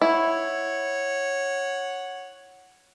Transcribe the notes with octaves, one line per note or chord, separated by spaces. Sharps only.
E4 C#5 F#5